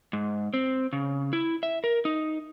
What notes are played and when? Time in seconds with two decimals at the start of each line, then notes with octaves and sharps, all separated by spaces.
0.13 G#2
0.54 C4
0.93 C#3
1.33 E4
1.63 E5
1.84 A#4
2.05 D#4